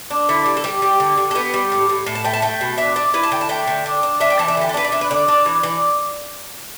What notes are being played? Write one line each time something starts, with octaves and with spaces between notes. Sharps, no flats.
D4
D3 E4
G3
A4
G3 G4
G3
D3
D3
A4
B3 G4
G3
A2
A2
A2 A4
A5
A3 G5
A5
A3 G5
B2
D4 E5
D4 D5
E4 B4
A5
D3 G5
A5
A3 G5
D3
D4
D4
D4 E5
G5
E3 A5
E5
D3 G4
A4
D4 B4
D5
D4 E5
B4
D3 D5
D4 D5
E3
E3 D5